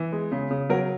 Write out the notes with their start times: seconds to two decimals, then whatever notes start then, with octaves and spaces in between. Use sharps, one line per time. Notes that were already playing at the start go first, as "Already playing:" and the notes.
Already playing: E3
0.12 G#3
0.32 C#3
0.51 C#3
0.69 F#3 A#4